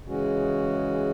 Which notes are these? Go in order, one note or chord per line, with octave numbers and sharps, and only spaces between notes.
C#3 E3 G#3 C#4 F#4